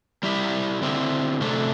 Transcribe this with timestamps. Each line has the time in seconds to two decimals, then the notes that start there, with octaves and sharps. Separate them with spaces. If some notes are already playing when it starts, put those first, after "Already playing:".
0.23 G3 E4 G4 E5
0.82 D3 C4 E4
1.41 C3 A3 D4